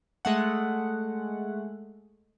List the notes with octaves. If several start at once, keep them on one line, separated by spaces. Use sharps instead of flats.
G#3 A3 F#5